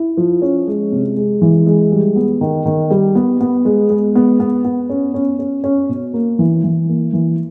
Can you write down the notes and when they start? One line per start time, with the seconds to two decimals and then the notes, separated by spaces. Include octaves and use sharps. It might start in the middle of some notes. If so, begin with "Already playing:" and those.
Already playing: E4
0.17 F3
0.42 C#4
0.67 G#3
0.92 C3
1.16 G#3
1.42 E3
1.67 G#3
1.92 G3
2.16 B3
2.41 D#3
2.65 D#3
2.90 G3
3.15 B3
3.41 B3
3.65 G#3
3.90 G#3
4.15 B3
4.40 B3
4.65 B3
4.90 C#4
5.14 C#4
5.39 C#4
5.64 C#4
5.89 B2
6.14 A#3
6.39 E3
6.64 E3
6.88 A#3
7.13 E3